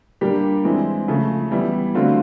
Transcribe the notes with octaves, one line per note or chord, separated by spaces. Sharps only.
A#2 G3 A#3 D4 G4
E3 G#3 C4 E4
C#3 F3 A3
E3 G3 B3 E4
D3 F#3 A3 C4 F4